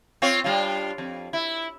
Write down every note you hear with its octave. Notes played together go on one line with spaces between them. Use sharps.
C4 F4 C#5
G3 D4 F4
F2
E4